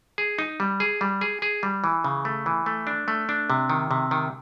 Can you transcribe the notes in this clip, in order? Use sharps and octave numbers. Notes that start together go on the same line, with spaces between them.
G#4
D#4
G3
G#4
G3
G#4
G#4
G3
E3
C#3
A3
E3
A3
D4
A3
D4
C3
D#3
C3
D#3